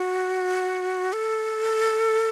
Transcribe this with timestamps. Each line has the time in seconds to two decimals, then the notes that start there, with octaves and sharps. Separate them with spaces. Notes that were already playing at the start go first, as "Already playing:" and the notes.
Already playing: F#4
1.13 A4